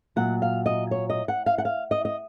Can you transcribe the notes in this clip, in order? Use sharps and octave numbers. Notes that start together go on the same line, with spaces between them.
A#2 F#3 F#5
F5
D#5
C#5
D#5
F#5
F5
F#5
F5
D#5
D#5